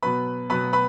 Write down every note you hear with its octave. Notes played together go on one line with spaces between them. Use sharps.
B2 F#3 B3 B4 B5
B2 F#3 B3 B4 B5
B4 B5